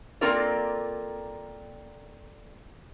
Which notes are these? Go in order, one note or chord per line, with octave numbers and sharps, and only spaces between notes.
A#3 C4 F4 A4 A#4 D5